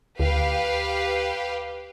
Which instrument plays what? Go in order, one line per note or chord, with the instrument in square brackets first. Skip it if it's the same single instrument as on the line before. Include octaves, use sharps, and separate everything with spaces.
[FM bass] D2 [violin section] G4 B4 F5